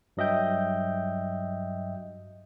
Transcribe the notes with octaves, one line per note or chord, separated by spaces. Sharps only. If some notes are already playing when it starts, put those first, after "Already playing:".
G2 F#3 D#5 E5 G5 G6